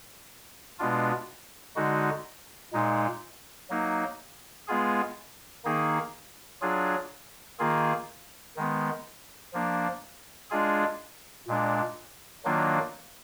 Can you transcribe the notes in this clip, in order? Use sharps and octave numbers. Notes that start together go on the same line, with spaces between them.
B2 G#3 B3 D4 F4
D3 G#3 D#4 F#4
A#2 G#3 D#4
F#3 A#3 D#4
G#3 B3 F4 G#4
D#3 A#3 D#4 G#4
F#3 D4 F4 G#4
D#3 A#3 F4 G#4
D#3 G#3 B3
F3 A#3 D4
G#3 D4 F4 G#4
A#2 G#3 D4
D#3 F#3 A#3 D4 F4